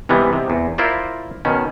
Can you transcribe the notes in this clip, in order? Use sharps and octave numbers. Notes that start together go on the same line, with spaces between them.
C3 E3 G3 G#3 B3
C3
E2
E4 F4 A#4 C5 D5
B2 D#3 C#4